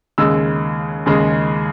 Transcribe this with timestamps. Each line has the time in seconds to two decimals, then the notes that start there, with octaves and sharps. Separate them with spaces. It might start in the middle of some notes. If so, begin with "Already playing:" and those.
0.18 D#2 C#3 G#3 E6
1.06 D#2 C#3 G#3